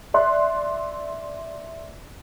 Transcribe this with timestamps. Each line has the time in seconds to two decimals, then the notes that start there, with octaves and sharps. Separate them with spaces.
0.14 D5 E5 C6 F#6